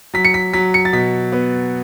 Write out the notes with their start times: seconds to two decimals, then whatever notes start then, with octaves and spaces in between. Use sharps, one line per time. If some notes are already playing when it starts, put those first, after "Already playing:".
0.14 F#3 B6
0.25 C#7
0.34 B6
0.53 F#3 B6
0.74 C#7
0.85 A6
0.93 B2 B6
1.32 B3